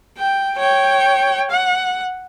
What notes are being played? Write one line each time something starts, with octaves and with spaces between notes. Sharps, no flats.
G5
C#5 G5
F#5